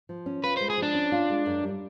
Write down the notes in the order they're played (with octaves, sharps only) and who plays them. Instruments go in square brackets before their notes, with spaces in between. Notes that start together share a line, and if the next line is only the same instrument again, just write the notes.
[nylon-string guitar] F3
C#4
[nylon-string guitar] F4 [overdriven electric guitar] B4
[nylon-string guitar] G#3 [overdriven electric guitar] C5
[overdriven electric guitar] G#4
[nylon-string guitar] F3 [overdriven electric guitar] D4
[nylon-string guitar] C#4
F4
G#3
F#2
G3